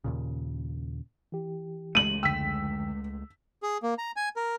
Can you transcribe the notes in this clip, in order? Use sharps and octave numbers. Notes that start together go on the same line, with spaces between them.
D#2 A#2 C#3
E3 G4
C#2 G#3 A3 D#7 F#7
F2 D3 G5 E6 B6
G#4
A#3
A#5
G#5
A#4